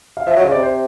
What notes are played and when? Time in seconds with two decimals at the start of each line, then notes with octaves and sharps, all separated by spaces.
0.17 F5
0.27 F3 E5
0.36 F#3
0.39 D#5
0.45 C#3
0.51 C3 D5
0.63 C5